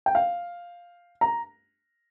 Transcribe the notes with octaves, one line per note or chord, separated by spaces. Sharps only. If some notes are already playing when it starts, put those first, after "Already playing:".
G5
F5
A#5